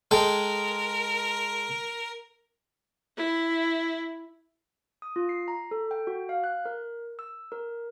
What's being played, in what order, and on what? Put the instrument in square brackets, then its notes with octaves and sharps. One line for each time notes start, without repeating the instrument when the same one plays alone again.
[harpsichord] G#3 A4 G5 [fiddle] A#4
[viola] E4
[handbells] D#6
F4
C7
A#5
A4
G5
F#4
F5
F#6
A#4
E6
A#4